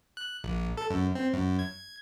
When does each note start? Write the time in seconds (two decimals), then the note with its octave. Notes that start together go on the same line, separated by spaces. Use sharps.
0.17 F#6
0.44 A#1
0.77 A4
0.90 F#2
1.15 C4
1.33 F#2
1.59 G#6